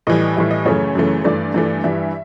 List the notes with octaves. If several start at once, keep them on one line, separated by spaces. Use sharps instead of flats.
A2 E3 G3 D#5
A2 E3 G3 E5
D#5
F#2 C#3 E3 A3 C#5
F#2 C#3 E3 A3
G2 E3 A3 D5
G2 E3 A3
G2 E3 G3 E5